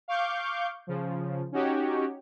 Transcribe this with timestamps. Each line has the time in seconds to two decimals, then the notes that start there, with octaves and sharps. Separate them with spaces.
0.08 F5 C#6 D6 G6
0.87 C#3 F3
1.52 C#4 D#4 F#4 G4 C#5